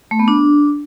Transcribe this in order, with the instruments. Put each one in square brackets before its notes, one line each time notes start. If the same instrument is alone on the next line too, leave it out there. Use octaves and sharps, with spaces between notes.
[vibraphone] A3
B3
D4